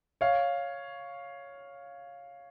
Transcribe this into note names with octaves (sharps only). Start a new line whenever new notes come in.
C#5 F5